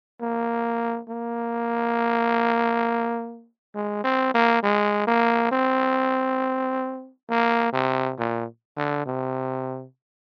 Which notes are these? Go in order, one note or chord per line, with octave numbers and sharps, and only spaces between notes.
A#3
A#3
G#3
C4
A#3
G#3
A#3
C4
A#3
C3
A#2
D3
C3